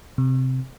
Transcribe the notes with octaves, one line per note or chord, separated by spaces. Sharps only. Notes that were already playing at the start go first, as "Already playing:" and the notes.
C3